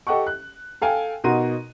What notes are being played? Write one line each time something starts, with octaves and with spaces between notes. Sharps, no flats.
G4 A4 D#5 F#5 G5 C#6
F#6
A4 F5 G5 G#5
B2 D#4 F#4 A#4 C6 D#7